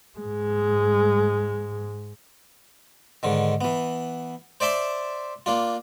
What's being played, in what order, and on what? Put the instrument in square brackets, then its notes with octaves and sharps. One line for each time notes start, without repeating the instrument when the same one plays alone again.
[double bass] G#2 G#3
[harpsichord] G#2 D3 D#3
E3 B3
C5 D5 E5 A5 C6
A#3 D4 F4